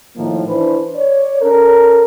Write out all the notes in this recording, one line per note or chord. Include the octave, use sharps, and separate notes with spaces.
A2 D#3 F3 A#3
E3 D4 B4 C5
C#5 D5
C#4 A4 A#4